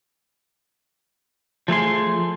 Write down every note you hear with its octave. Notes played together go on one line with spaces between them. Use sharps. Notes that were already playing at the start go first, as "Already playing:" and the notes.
F3 A3 G#4 C6